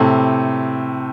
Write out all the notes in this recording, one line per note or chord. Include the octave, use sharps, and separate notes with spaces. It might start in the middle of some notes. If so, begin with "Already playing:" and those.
Already playing: A2 C3